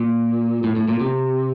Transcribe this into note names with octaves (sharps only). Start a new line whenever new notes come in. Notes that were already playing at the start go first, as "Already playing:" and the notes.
Already playing: A#2
A2
A2
A#2
C3